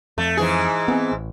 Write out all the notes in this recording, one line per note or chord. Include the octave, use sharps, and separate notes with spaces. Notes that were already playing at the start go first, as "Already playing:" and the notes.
F2 A3
G#2 E3 G#4
B3 C4
A1